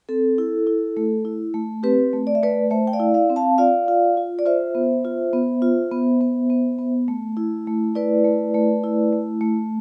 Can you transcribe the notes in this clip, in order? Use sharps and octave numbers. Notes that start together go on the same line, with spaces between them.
C4 A4
E4
E4
A3
E4
A3
C4 G4 B4
A3
D5
E5
A3 B4 D5
A3 C5 E5
G5
D5 F5
E4
D5 F5
C4
F5 A5
F4 D5 F5
F4
F4
D5
F4 C5 E5
B3
F4
B3
F4
B3
B3
B3
B3
A3
E4
A3
E4 B4 D5
A3
A3
E4
A3
A3